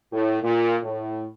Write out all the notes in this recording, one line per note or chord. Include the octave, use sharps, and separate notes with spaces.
A2
A#2
A2